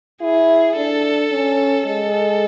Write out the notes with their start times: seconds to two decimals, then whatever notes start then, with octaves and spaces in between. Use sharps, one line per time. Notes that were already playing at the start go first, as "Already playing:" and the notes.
0.21 E4 G#4
0.76 D4 A4
1.31 C#4
1.86 G#3 A4